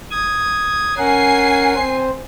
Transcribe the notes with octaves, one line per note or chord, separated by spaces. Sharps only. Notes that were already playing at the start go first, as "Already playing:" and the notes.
D#6 G#6
C#4 A#4 F#5 G#5 C7
C4 C5